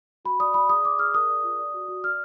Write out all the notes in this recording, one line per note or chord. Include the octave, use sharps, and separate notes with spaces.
F#4 B5
D5 D#6
D5 B5
G#4 D#6
D5 D6
G#4 F6
A#4 D#6
D5
F4
D5
F#4
F#4
D5 F6